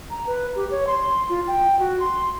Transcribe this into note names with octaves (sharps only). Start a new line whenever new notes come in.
A#5
B4
G4
C#5
C6
F4
G5
F#4
C6